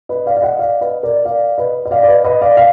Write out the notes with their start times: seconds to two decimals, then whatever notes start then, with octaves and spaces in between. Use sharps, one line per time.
0.09 B4 D#5
0.26 D5 F5
0.36 F5
0.42 D#5 F#5
0.59 D5 F5
0.81 B4 D#5
1.03 A#4 D5
1.25 D5 F5
1.58 B4 D#5
1.85 D#5
1.91 D5 F5
2.03 D5
2.08 B4 D#5
2.24 B4 D#5
2.41 D5 F5
2.57 F5